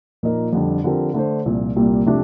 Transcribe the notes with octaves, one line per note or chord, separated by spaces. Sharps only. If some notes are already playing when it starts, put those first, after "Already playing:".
A#2 F3 A#3 D#4 A#4
F2 D3 G3 D4
D3 F3 C4 G4 A#4
D3 A3 D4 A4 C5
C2 A#2 F3
C2 A#2 G3 A#3
C3 F3 A3 D4 G4